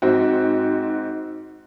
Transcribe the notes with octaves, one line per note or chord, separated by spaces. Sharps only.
G#2 C4 F#4